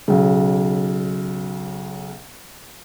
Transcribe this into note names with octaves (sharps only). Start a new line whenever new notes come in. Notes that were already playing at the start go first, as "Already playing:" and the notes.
B1 C#3